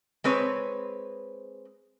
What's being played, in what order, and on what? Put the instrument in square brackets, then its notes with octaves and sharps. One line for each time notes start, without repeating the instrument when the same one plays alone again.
[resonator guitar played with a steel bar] G#3 C4 B4 C#5